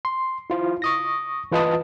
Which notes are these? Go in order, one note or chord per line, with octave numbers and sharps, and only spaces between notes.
C6
E4 F4 C5
C#6 D#6 A#6
E3 F4 B4 D#5 A5 D#6